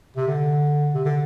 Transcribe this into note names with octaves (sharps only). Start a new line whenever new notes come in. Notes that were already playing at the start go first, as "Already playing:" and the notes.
C3
D3
C3
D3